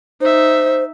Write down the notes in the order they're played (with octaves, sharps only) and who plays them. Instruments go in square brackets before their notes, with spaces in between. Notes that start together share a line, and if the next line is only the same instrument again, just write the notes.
[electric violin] D#4 E5 [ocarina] C5